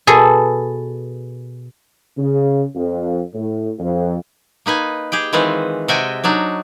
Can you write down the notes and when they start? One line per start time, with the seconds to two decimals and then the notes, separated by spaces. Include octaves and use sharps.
0.07 B2 G#4 A4
2.17 C#3
2.75 F2
3.34 A2
3.79 F2
4.66 A#3 D#4 B4 G#5
5.12 G4 G#4 G5
5.33 D#3 E3 G#3 C4 F4 B4
5.88 C3 G#3 F#4 E5 G5 G#5
6.24 F#3 D4 D#4